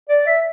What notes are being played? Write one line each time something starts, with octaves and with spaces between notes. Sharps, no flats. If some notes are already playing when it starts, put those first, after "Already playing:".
D5
E5